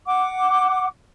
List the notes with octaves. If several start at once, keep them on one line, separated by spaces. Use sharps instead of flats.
F#5 D6